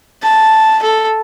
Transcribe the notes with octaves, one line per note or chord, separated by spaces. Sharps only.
A5
A4